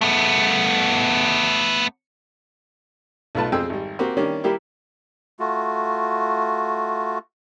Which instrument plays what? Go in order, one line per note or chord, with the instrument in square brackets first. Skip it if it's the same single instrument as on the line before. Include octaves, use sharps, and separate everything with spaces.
[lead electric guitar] A3 B3
[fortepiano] B1 B2 A3 F4 B4 A5
F2 C4 G#4 G5 E6
G#1 G3
A#3 C4 F#4 G4
D#3 G3 A#3 C#4 D4
G3 A#3 E4 G4
[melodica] A3 F4 F#4